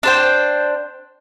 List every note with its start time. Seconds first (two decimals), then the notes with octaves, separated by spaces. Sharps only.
0.03 D4 C5 G5